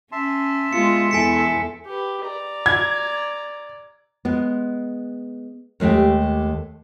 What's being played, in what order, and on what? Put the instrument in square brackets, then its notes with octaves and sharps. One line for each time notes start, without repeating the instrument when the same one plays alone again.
[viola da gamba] C#4 [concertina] E5 A5 C6
[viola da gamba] G#3 B3 F4 [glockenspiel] C#7
[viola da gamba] E2 E4 A4 [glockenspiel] G#5 B6 C#7
[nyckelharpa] G4 B4
D5 A#5
[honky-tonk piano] G#6
[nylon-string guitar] G#3 B3
D#2 G#3 A3 G4 G5